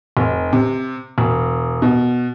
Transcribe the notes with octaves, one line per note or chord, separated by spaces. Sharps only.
F1
C3
E1
B2